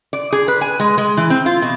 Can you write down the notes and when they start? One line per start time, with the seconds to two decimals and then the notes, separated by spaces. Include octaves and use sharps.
0.13 D5
0.32 G#4
0.48 B4
0.61 G#5
0.80 G#3
0.98 G#3
1.17 E3
1.30 C4
1.46 F4
1.62 B2